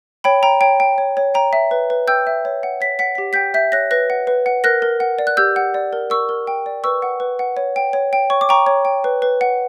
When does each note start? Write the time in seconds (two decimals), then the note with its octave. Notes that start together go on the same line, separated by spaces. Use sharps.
0.24 C#5 G5 B5
0.43 G5 A#5
0.61 C#5 G5
0.80 G5
0.98 C#5
1.17 C#5
1.34 G5 A#5
1.53 E5
1.71 B4
1.90 B4
2.08 G5 E6 G6
2.27 E5
2.45 C#5
2.63 F#5
2.81 C#5 B6
2.99 F#5 B6
3.15 G4 B6
3.33 G5 G6 B6
3.54 E5 G6 B6
3.72 C#5 F#6 A#6
3.91 B4 F#6 A#6
4.10 F#5
4.27 B4
4.46 F#5
4.64 A#4 F#6 A#6
4.82 A#4
5.00 F#5
5.19 D5
5.27 F#6
5.37 G4 E6 G6
5.56 F#5
5.74 D5
5.93 A#4
6.10 A#4 C#6 E6
6.29 A#4
6.47 G5
6.66 D5
6.84 B4 C#6 E6
7.02 F#5
7.20 B4
7.39 F#5
7.57 C#5
7.76 G5
7.93 C#5
8.13 G5
8.30 C#5 C#6
8.41 D6
8.49 G5 A#5 C#6
8.67 C#5
8.85 G5
9.04 B4
9.22 B4
9.41 F#5